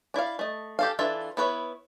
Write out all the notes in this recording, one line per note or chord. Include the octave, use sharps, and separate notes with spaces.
D4 E4 D5 F5
A3 D#5
G4 A4 F5
E3 D4 F4 A4 E5
B3 E4 B4 C#5